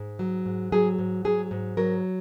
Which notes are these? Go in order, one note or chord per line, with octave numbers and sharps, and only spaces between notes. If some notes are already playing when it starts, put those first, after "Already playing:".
Already playing: G#2
F#3
G#2
F#3 G#4
G#2
F#3 G#4
G#2
F#3 A#4